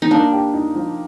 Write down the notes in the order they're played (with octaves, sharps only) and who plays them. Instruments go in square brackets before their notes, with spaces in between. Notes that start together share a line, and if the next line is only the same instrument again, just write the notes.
[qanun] D#4
[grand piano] A#3 [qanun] D4
[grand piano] G4
D#4
F3